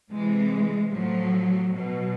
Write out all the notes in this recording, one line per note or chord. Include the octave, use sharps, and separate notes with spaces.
C3 E3 G#3
A2 F3 F#3
B2 F#3